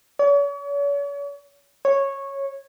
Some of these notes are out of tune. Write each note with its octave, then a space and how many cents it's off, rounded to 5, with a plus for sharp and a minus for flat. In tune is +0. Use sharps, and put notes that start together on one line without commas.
C#5 +40
C#5 -10